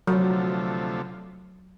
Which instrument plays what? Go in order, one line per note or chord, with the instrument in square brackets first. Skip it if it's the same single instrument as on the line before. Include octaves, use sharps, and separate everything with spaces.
[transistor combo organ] D2 C3 F3 A3 [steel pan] F#3